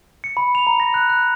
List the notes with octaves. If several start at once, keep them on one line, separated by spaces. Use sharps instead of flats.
C#7
B5
F7
A#5
A#6
F#6
F#6